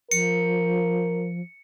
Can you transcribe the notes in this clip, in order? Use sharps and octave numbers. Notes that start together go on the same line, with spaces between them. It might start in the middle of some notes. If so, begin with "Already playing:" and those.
F3 A#4 C#7